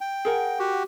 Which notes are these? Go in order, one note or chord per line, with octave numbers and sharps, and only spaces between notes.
G5
G#4 A#4 F#5
F#4 G4